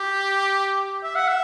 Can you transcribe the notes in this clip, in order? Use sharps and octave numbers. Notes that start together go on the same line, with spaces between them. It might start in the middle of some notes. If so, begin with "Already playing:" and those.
Already playing: G4
E5
F#5
E5